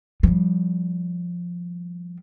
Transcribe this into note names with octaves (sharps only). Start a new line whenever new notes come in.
F3 G3